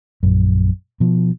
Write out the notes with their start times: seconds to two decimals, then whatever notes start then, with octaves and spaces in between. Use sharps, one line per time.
0.23 A#1 F#2
1.00 B2 F3